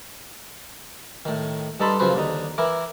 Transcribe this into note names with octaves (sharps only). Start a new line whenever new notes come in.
A2 D#3
G2 D#4 A4 A5 B5 C6
F#2 C#3 F3 F#4 B4 C5
D#2 D3 D#4
E3 E4 A#4 D6